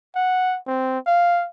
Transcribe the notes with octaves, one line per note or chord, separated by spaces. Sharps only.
F#5
C4
F5